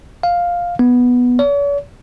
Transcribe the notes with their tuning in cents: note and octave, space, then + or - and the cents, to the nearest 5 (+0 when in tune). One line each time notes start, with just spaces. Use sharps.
F5 +5
B3 -5
C#5 +45